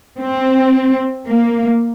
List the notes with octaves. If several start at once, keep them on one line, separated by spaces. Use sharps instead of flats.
C4
A#3